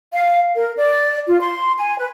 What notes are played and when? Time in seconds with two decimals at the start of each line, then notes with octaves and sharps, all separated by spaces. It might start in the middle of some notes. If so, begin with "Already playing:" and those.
0.12 F5
0.55 A#4
0.77 D5
1.27 F4
1.40 C6
1.78 G#5
1.98 B4